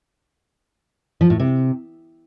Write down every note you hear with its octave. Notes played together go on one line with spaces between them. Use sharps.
F3
A2
C3